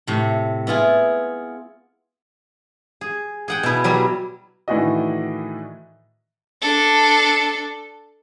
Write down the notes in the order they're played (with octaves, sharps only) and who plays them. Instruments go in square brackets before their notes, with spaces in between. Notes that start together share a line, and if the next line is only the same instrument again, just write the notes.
[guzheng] A2 C3
B3 E4 F4 G#4
G#4
G#4 F#5 G5
B2 E4
F#3 G3 E4
[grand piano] A2 D#3 E3 D4 F#4 D#5
[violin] D4 A4